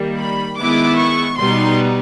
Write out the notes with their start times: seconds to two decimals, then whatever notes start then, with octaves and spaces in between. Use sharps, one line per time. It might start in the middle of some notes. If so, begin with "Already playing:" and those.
Already playing: D#3 G3 A#3
0.17 B5
0.58 D#3 G#3 B3 E4 D6
0.98 C#6
1.38 B2 G3 B3 D#4 C6